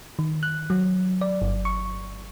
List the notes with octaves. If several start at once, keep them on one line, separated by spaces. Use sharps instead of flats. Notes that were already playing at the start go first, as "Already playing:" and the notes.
D#3
F#6
F#3
D5
G1
C#6